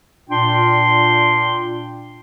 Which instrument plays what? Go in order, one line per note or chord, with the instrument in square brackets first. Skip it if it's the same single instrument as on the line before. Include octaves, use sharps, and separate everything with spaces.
[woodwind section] A#2 D4 F4 G5 C6